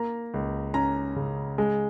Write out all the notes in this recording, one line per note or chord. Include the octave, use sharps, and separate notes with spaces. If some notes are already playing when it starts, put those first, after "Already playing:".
Already playing: A#3 A#5
C#2
C#4 A#5
C#3
G#3